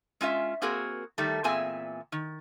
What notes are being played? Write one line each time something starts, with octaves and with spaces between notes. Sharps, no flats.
G#3 C#4 F4 E5
A#3 C4 F#4 G#4 A#4
D#3 G3 A3
E2 A#2 C4 G#4 E5 G#5
D#3